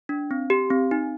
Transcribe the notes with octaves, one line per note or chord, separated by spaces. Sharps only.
D4
C4
G4
C4
D#4